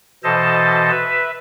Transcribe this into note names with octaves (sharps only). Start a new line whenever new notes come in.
B2 E3 A4 C5 D#5 A5
B4 E5